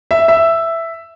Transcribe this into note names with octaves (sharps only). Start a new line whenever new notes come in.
E5
E5